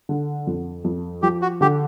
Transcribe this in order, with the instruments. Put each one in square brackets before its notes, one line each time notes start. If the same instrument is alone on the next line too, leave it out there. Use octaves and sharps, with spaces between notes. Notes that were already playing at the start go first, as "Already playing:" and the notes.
[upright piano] D3
F2
F2
[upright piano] F3 [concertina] G4
[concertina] F#4
[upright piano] D3 [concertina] G4